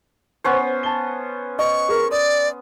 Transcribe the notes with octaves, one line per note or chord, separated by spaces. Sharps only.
B3 C#4 C5
A5 G7
D#5 C#6
G#4 A#4
D5 D#6